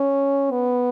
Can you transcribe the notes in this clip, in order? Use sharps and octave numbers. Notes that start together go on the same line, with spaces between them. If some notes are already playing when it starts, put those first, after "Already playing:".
Already playing: C#4
B3